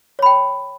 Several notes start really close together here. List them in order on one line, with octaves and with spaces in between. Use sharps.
C#5 B5 G5